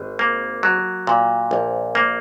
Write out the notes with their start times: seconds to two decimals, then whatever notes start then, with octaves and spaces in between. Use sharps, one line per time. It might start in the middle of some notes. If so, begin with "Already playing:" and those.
Already playing: G#1
0.19 A#3
0.63 F#3
1.07 A#2
1.51 A#1
1.95 A#3